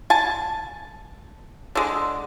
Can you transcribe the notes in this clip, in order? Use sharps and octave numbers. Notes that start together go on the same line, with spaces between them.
G#5 A5
D3 G#3